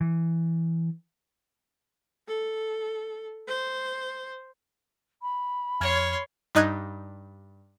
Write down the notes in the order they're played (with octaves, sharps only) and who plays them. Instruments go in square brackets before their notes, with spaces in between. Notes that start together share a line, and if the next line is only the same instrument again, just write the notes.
[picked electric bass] E3
[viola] A4
C5
[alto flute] B5
[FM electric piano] F2 F6 G#6 [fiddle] C#5 C6
[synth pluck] G2 D#4 D#5 F#6 G#6